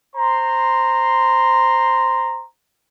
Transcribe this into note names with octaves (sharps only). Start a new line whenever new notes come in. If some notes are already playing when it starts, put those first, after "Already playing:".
C5 A#5 C6